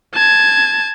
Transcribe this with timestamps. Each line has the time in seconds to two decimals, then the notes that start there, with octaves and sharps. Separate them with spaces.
0.14 A5 G#6